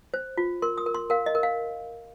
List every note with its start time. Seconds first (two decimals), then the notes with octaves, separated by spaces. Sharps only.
0.14 C5
0.37 F4
0.62 A#4 C6
0.78 D#6
0.86 A#4
0.95 C6
1.10 A#4 F5
1.26 D#5
1.35 A#4
1.43 F5